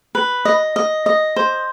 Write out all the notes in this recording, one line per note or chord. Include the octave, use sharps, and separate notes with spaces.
B4
D#5
D#5
D#5
C5